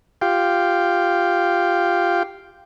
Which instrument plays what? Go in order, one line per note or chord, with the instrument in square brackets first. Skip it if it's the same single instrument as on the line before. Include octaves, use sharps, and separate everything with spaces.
[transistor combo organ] F4 G4 F5 G5